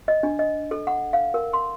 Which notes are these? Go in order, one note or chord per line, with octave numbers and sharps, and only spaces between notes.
D#5
D4
D#5
A4
F#5
F5
A#4
C6